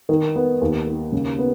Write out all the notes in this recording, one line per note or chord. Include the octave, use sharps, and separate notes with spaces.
D#3
B3
D#2
D#3
C#3
B3